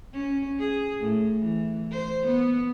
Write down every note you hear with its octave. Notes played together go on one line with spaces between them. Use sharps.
C#4
G#4
A2
E3
C5
B3